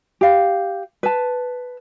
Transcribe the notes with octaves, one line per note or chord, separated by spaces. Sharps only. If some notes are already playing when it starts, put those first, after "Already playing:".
G4 F5
B4 A5